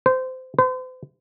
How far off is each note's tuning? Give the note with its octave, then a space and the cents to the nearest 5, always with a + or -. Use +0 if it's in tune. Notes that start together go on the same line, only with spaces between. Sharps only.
C5 -20
C5 -40